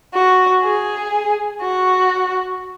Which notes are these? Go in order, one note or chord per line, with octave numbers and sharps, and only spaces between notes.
F#4
G#4
F#4